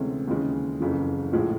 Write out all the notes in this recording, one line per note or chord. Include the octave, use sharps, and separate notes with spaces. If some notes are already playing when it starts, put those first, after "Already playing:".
Already playing: D2 C3 E3 G#3 C#4
D#2 C#3 E3 G#3 C#4
F#1 F2 C#3 E3
A#1 A2 F3 G#3